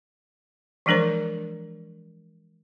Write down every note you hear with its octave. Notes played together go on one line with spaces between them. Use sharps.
E3 F3 G#3 D4 A#4 C5